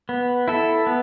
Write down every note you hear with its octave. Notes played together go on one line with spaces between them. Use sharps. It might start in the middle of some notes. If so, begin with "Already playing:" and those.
B3
E4 A4
B3